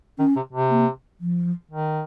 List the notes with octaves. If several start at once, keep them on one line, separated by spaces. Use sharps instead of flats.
D#3 C#4
C3
C3
A#3
F3
D#3